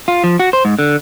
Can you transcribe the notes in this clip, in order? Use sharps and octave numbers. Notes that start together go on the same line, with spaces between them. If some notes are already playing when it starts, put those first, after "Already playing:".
F4
F3
F#4
C5
G#2
D3